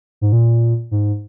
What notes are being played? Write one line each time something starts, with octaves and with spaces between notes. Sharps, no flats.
G#2
A#2
G#2